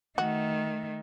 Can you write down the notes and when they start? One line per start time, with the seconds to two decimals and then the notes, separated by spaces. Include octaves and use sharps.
0.18 D#3 A3 F#4